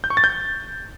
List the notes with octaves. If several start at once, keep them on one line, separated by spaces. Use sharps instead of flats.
G6
C#6
A6
G6